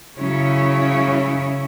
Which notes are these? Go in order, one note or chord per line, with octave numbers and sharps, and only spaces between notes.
C#3 F#3 C#4 E4 C#5